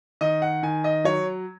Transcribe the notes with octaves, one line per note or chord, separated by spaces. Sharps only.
D#3 D#5
F#5
D#3 G#5
D#5
F#3 C#5